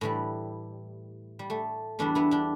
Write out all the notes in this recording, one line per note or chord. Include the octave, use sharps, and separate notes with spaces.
A2 E3 G3
G3
A3
E2 E3 G3 A3 D4
B3 E4
D4 G4